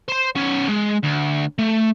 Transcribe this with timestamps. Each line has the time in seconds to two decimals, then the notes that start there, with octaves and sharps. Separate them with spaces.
0.08 C5 C6
0.36 B3 C#4
0.69 G#3
1.04 D2
1.58 A3